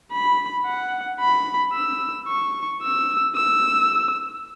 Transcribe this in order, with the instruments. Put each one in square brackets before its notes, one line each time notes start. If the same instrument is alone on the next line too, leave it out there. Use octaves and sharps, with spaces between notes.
[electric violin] B5
F#5
B5
E6
C#6
E6
E6